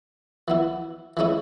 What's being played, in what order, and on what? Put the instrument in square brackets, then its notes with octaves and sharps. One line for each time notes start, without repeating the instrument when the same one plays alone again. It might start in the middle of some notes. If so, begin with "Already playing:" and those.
[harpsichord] E3 B3 E4
E3 G#3 C#4 E4